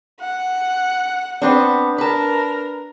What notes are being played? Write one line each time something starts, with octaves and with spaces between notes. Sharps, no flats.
F#5
B3 C4 D4
D4 A#4 B4 A5